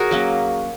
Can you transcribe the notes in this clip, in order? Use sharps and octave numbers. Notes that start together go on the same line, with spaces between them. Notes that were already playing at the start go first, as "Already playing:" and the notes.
Already playing: F#4 G#4 A#4 C#5
F#3 A#3 C#4